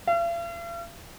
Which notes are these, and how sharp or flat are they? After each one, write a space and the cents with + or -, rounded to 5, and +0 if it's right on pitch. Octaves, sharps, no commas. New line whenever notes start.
F5 -45